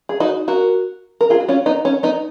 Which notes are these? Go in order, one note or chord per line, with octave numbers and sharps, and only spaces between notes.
G#4
D#4 F#4
F#4 A#4
A#4
F4 G#4
F#4
C#4 F4
B3 D#4
C#4
B3 D#4